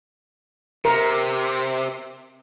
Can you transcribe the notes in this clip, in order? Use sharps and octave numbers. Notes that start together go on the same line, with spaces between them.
C3 A#4